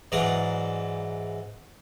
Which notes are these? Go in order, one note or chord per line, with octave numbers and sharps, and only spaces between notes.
G#2 E3 F#3 D5 A#5